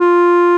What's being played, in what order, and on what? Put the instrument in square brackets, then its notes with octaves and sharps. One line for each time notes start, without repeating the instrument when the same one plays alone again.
[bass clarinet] F4